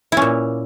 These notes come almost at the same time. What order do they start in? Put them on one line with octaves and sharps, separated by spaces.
E4 C#4 A#2